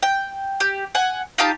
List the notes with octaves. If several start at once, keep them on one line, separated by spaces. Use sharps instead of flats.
G5
G4
F#5 G#5
D#4 F4 G4 A5